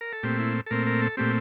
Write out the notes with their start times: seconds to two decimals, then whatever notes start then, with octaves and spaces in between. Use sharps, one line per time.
0.01 A#4
0.13 A4
0.23 A#2 A3 C4 G4
0.39 E4
0.66 A4
0.71 A#2 A3 C4 A#4
0.87 A#4
1.02 A4
1.17 A#2 A3 C4 G4